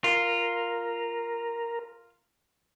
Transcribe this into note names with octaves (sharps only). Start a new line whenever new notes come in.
F4 A#4